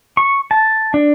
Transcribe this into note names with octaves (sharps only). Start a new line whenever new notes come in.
C#6
A5
D4